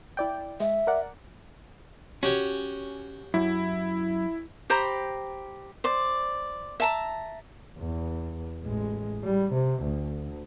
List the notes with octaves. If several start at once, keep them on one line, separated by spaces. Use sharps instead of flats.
E4 D5 G5
G#3 E5
A#4 D5 F#5
C#4 F#4 G4 C#5
F#2 E4
G4 C5 A#5 B5
C5 D5
E5 A5 A#5
E2
A1 G#3
G3
C3
D2